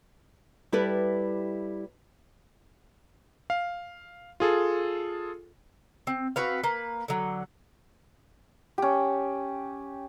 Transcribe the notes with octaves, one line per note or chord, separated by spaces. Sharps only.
G3 E4 G4 A4 B4 E5
F5
F4 G#4 A4
C4
C4 F#4 B4 F5
A#3 B4
D3 F#3
C#4 G4